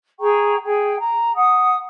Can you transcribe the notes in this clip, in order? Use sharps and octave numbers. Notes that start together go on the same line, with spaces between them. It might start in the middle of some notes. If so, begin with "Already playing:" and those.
G#4 G5 A#5 C#6
G#4 G5
A#5
F#5 D#6